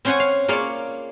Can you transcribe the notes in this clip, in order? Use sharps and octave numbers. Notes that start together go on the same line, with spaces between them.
C4 C#4 C5 C#5 F#5 G#5
F5
A#3 F4 G#4 C#5 D5